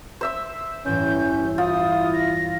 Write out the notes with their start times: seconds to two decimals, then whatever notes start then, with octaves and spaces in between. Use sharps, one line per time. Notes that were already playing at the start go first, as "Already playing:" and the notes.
0.21 C5 E5 E6
0.86 A1 E2 G2 C#4 G6
1.58 E4 F4 D#6
2.13 A#6